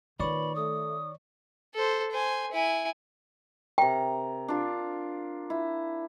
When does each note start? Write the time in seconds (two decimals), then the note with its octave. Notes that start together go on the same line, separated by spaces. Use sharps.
0.20 A#2 D#3 D#4 B4 C#5 D5 B5 C#6
0.55 A3 A4 D#6
1.75 A4 C5
2.11 C5 G#5
2.52 E4 G#5
3.78 C3 A#4 G5
4.48 D4 F4
5.50 E4